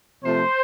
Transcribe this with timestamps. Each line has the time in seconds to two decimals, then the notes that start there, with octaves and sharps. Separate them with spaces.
0.24 C3 F3 A3 C5